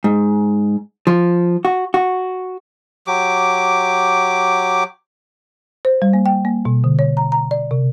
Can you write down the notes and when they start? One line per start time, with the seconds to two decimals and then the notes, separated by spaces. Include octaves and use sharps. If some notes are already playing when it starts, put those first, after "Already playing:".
0.04 G#2
1.07 F3
1.65 F#4
1.94 F#4
3.07 F#3 G4 D6
5.85 C5
6.02 G3
6.13 A#3
6.26 G5
6.45 A#3
6.65 B2
6.84 D3
6.99 C#5
7.17 A#5
7.32 A#5
7.51 D5
7.71 C3